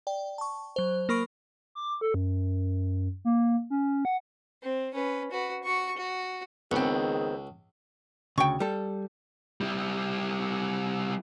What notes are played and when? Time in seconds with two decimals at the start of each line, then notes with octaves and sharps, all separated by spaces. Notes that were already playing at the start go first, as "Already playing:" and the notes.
0.07 D5 G5
0.38 A5 C#6
0.76 F#3 C5
1.09 A#3 A#4 B5 C#6 D7
1.75 D6
2.01 A4
2.14 F#2
3.25 A#3
3.70 C#4
4.05 F#5
4.62 C4
4.94 C#4 B4
5.31 F#4 B4
5.63 F#4 C#6
5.97 F#4
6.72 C#2 D#3 B3 C4 G#4
8.38 D2 C#3 G5 C#6
8.60 G3 A4
9.61 G3 E4